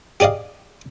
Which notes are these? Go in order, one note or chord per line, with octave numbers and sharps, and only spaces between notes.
G4 G#4 D5 D#5 F5